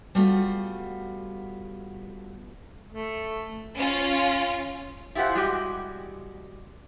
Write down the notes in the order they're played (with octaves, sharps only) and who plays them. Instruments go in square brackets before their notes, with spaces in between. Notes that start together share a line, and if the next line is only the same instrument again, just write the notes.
[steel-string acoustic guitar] G3 A3 B3 F4 F#4
[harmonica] A3
[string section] C#4 F4
[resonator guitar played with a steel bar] E4 F4 G4 G#4 C5 F#5
G3 G#3 F#4 G4